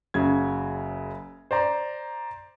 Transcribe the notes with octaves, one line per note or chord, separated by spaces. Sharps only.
F#1 C#3 F#3 G#6
C5 D5 A#5